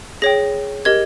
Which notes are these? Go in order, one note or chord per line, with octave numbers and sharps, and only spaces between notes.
G#4 C#5 G5 A#6
G4 A#4 D#5 G#6